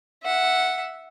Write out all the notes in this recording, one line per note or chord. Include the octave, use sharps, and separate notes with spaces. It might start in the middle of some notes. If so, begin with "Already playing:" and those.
E5 F#5